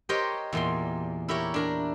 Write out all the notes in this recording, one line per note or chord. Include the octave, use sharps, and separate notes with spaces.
G4 A#4 C5 C#5 D#5 G5
E2 A#2 C6
E4 G4 A#4 C#5
D4 A#4